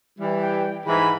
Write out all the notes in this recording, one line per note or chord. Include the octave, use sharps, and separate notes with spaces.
E3 G3
G5
G#2 E3 B5